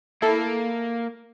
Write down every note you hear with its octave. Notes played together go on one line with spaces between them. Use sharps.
A#3 E4 A4